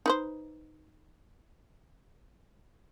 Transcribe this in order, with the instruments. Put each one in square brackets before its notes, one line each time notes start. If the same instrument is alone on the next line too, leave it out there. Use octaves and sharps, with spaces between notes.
[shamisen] D#4 B4 C5